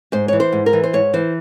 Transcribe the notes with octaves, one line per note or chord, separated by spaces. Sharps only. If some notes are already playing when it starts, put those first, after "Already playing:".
G#2 C5
E3 C#5
C5
G#2
A#4
E3
C5
G#2 C#5
E3 C5